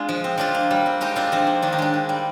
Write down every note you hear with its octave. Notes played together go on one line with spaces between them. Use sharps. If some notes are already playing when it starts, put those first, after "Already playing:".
Already playing: G#3 D4 F4
F3
C4
F3 D4 F4
A#3
G3
C4
G#3 D#4 G4
C4 D4 F4
F3 C4
A#3
D#3 D4
D#4
G#3 D4
D#3
G3